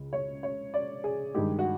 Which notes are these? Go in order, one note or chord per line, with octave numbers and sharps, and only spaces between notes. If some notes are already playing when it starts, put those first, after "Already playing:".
Already playing: C#2 C#3
C#5
C#5
D5
G#4
G2 D#3 G#3 G4
F#4